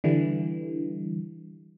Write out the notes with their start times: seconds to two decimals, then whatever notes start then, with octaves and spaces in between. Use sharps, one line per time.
0.04 D3 E3 G3